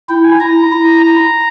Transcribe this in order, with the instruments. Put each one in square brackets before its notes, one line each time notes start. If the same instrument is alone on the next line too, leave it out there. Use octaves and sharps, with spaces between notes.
[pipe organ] E4 [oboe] G5
[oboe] G#5
[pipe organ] E4 [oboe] A#5
[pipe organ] E4
[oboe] A#5